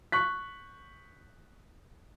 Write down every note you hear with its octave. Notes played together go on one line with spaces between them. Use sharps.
C#6 F#6 B6